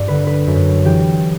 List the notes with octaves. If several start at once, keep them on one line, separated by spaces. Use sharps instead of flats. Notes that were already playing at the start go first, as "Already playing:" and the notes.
Already playing: G2 D5
D3 B4
B4
F#2
E3 G4